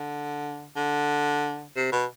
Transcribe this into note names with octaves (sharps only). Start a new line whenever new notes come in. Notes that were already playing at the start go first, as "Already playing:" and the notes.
Already playing: D3
D3
C3
B2